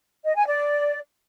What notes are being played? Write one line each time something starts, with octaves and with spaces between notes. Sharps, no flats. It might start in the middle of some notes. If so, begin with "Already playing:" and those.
D#5
G#5
D5